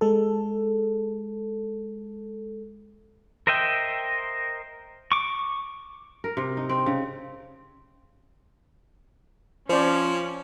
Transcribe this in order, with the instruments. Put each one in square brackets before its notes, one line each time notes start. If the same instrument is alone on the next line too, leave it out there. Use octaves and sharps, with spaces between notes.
[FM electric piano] G#3 A4
[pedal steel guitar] A#4 C5 D#5 E5 G5
C#6 D6
[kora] A#4
C3
D#4
C4
C#3
[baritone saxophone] F3 [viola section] C#4 [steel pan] C5 D5